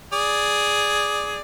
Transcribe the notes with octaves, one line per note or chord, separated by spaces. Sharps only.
G#4 D5